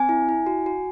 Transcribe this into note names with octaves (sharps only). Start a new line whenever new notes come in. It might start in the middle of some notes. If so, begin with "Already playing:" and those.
Already playing: C4 G#5
E4
E4
F#4
F#4